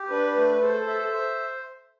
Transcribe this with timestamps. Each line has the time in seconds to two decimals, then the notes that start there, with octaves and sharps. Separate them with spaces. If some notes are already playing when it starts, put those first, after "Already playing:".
Already playing: G4
0.10 D4 B4
0.36 A3
0.62 A4 C5
0.87 E5
1.14 C5